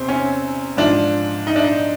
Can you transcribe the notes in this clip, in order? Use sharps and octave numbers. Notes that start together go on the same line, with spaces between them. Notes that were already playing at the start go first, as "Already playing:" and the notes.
Already playing: E2 C3 C4
C#4
G#2 F3 D4
D#4
D4
D#4